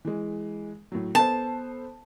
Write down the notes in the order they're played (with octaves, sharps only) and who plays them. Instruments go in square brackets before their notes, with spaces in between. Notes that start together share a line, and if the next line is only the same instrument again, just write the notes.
[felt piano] E3 G#3
A2 F#3
[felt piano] B3 A4 C5 [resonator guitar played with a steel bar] A5